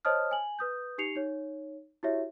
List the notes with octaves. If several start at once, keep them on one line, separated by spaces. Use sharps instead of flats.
C5 C#5 D#5 A5 D#6 F6
G#5 F#7
B4 D#6 G6
D#4 G4 C7 C#7 F7
D#4 C#5
E4 F#4 G4 C#5 E5